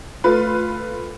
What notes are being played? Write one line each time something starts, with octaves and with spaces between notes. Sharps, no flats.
A3 F4 B4